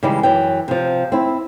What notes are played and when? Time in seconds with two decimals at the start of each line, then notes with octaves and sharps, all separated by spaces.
0.03 C#3 E3 G3 G#3 D#4
0.23 F#2 E3 G5
0.68 C3 F3
1.12 C4 E4